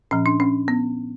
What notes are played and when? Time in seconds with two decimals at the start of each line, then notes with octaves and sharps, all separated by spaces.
0.11 A#2 F3 C#4
0.26 D4
0.40 C#4
0.68 B3